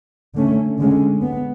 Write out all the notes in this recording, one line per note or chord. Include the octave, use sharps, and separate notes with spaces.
D3 A3 C#4
D3 G#3 C#4
B3